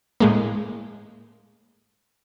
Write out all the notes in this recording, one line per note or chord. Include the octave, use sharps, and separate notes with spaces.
A2 G#3 A#3